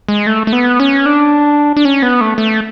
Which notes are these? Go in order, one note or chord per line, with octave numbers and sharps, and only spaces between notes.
G#3
A3
A3
B3
C#4
D4
D4
C#4
B3
A3
A3